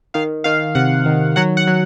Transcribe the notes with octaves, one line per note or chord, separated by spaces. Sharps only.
D#3 F5
D#3 F5
C3 F#5
D#3
F#3 F#5
F#5
F#3